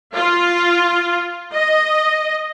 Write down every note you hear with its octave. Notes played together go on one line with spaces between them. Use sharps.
F4
D#5